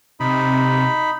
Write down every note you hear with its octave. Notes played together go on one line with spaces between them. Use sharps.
C3 D#4 B5